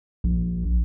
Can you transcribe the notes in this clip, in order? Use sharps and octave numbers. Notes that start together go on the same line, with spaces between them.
A#1